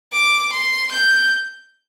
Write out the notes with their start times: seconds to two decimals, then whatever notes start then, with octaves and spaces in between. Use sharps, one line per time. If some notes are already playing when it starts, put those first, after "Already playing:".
0.13 D6
0.53 C6
0.92 G6